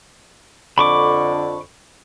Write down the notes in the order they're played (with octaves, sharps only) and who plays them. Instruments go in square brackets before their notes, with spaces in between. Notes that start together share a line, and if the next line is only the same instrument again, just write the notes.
[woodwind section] F2 D3 [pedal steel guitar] B5 C#6 D6